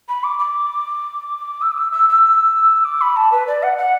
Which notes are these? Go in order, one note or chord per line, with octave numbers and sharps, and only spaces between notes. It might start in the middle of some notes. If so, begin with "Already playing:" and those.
B5
D6
D6
E6
D6
E6
E6
E6
D6
B5
A5
B4
D5
F#5
F#5